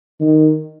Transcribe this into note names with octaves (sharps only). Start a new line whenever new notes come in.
D#3